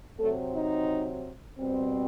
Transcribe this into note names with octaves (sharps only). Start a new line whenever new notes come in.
C3 F#3 A3 C4 A4
D#4
B2 G3 C4